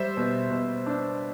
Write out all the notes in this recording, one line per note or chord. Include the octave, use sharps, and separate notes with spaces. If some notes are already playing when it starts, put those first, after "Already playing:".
Already playing: G3 C5 E5
B2
B2
D4